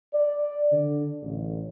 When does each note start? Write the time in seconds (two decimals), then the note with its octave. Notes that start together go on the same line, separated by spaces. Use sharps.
0.13 D5
0.71 D3
1.23 A1